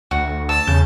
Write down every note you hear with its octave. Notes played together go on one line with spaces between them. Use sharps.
D2 F#4
A5 E6
E2 C#3 G6